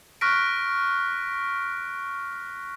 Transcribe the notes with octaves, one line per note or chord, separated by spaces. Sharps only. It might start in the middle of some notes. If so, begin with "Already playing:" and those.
C#6 F6 F#6 A#6 B6 D7